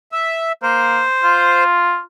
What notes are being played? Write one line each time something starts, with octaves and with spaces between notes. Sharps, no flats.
E5
A#3 C5
F4